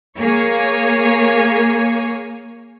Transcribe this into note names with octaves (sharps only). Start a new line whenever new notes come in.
A#3 G#4 C#5 G#5